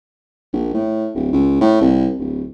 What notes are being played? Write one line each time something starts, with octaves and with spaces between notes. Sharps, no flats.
A#1
A2
D1
C#2
A2
C2
D1